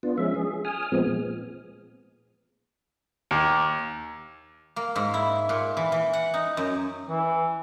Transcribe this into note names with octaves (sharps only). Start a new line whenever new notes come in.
B3 D4 F4
F3 G#3 C#4 E5
G#4
G#5 D#6 F6
A#2 F3 G#3 B3 C4
D#2
A#3
G#2
E4
A#2
E3
E3
F#5
D#4
F#2
E3